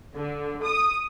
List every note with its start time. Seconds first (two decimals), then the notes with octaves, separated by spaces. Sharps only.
0.15 D3
0.63 D#6